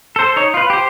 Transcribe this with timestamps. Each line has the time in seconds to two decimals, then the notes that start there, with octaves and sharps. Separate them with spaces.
0.16 A4 C5
0.36 D#4 C#5
0.54 F4 B4
0.70 G4 C5